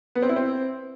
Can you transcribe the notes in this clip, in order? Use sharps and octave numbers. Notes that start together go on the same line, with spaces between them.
B3
C4
E4
C4